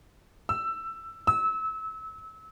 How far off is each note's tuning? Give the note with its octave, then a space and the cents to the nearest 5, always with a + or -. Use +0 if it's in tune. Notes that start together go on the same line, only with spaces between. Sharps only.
E6 +15
E6 -25